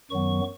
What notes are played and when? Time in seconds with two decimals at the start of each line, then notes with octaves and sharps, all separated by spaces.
0.10 F#2 D#3 F#3 B3 C#6